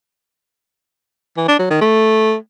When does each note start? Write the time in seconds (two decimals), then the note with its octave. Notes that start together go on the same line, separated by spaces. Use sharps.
1.37 E3
1.48 D4
1.59 F#3
1.70 D#3
1.81 A3